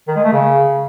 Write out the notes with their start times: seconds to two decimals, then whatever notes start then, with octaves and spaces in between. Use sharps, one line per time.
0.08 D#3
0.16 G#3
0.24 A3
0.32 C#3